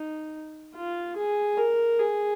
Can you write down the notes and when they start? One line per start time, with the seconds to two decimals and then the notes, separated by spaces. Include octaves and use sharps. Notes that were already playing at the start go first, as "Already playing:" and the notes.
Already playing: D#4
0.76 F4
1.16 G#4
1.58 A#4
2.00 G#4